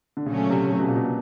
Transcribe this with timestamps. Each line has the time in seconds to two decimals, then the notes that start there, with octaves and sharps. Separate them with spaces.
0.17 D3
0.26 A#2 C#3 F#3 A3 C#4
0.50 C3
0.72 C3
0.79 B2
0.88 A#2
0.96 B2